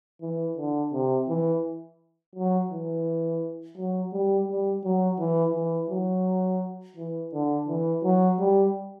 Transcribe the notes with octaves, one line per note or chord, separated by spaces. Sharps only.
E3
D3
C3
E3
F#3
E3
F#3
G3
G3
F#3
E3
E3
F#3
E3
D3
E3
F#3
G3